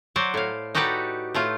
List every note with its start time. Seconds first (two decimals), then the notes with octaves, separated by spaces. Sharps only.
0.16 F#3 F#4 C5 D5
0.34 A2 F5
0.75 D#4 F#4 G4 A4 B4 D5
1.34 A2 A3 F4